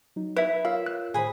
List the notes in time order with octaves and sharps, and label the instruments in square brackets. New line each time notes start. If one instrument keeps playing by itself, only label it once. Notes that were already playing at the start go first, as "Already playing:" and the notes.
[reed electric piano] F#3 D#4
[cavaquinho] E4 [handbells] B4 E5
[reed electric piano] F4 A#4 C#5 [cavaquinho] E5 [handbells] F5
[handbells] F#6
[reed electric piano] A2 D#3 C5 [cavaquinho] G#4 B5